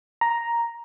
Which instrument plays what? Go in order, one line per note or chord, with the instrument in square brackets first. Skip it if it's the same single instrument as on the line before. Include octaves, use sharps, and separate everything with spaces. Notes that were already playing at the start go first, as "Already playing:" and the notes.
[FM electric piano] A#5